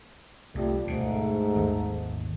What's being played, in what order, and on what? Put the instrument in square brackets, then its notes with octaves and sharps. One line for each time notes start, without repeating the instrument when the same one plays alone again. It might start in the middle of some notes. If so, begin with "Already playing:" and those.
[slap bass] C2 [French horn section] G3 A3 F4
[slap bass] D2 B2 [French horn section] G#2 A3
[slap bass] G#1 D#2